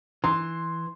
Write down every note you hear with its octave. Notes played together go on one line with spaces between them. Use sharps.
E3 C6